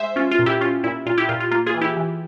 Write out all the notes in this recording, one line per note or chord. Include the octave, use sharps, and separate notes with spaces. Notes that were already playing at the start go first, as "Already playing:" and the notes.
Already playing: G#3 C5 E5
C#4 F4
F4
A#2
E4 G4
C#4 F4
A#2 E4
A#2 F4
E4 G4
A#2 F4
F4
A#3 F4
F4 G#4
E3
E4 G4
E3